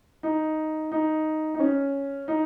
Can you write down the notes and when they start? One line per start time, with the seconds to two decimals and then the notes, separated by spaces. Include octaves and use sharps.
0.23 D#4
0.92 D#4
1.55 D#4
1.60 C#4
2.28 D#4